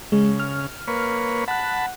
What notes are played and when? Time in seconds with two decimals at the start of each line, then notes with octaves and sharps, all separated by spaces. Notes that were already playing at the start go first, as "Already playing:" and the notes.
0.12 C#3 G#3
0.40 F6
0.87 A#3 B4 C#5
1.48 F#5 A5 B5 F#6